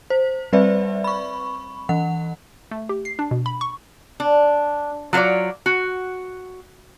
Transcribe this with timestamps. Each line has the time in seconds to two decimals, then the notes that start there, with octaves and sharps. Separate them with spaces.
0.10 C5
0.53 G3 C4 B4 D5 E5
1.04 B5 C#6
1.89 E3 F#5
2.71 A3
2.89 G4
3.05 C7
3.19 D4
3.31 B2
3.46 B5
3.61 C#6
4.20 D4
5.13 F#3 F4 B4 C#5 D5
5.66 F#4